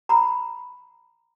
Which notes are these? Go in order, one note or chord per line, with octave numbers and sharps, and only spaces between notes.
A#5 B5